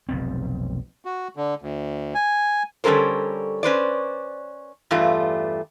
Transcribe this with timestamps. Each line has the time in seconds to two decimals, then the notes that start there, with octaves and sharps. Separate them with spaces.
0.09 F1 B1 F2 C4
1.04 F#4
1.36 D3
1.62 D2
2.15 G#5
2.84 D3 G3 C#4 A4 A#4 C5
3.63 C#4 B4 C5 D5
4.91 E2 G2 G3 A3 F4